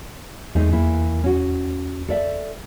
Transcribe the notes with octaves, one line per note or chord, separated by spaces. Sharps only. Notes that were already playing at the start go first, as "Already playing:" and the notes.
E2 G#3 A3 D#4
E3 A#3 E4
C#4 F#4
A4 D5 E5